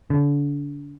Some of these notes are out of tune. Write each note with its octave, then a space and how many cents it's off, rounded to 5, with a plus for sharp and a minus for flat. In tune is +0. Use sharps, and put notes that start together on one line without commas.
D3 -35